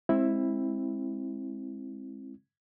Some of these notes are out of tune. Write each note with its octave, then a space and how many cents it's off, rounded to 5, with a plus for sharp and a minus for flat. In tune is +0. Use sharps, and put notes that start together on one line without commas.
G#3 +0 C4 +25 E4 +0